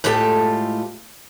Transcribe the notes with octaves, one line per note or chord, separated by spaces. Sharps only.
A2 G#3 F4 G4 A4 A5